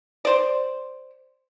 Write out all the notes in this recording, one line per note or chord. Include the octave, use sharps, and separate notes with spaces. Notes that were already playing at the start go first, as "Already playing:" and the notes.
C5 D5